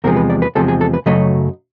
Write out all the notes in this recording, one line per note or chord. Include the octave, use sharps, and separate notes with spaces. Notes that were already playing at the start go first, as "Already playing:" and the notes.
E2 C3 F3 G#3 A#4
B4
D5
B4
E2 C3 F3 G#3 A4
G#4
A4
B4
F#2 C#3 F#3 A3 D#5